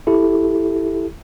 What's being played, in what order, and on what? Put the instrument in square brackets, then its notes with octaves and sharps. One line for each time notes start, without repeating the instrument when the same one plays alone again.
[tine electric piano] E4 G4 A4